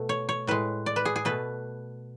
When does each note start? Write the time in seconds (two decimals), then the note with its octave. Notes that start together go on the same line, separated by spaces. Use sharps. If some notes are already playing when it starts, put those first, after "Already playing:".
Already playing: B2 A3
0.09 C#5
0.29 C#5
0.47 A2 G#3 B4
0.86 D5
0.96 B4
1.05 G#4
1.16 G#4
1.25 B2 A3 B4